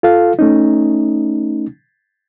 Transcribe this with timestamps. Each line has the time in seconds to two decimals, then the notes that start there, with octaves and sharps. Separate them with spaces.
0.03 F4 A4 F5
0.39 A3 C#4 D#4